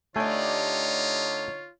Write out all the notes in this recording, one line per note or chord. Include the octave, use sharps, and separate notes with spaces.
D3 A3 D#4 F4 G4 C#5 D5 G#5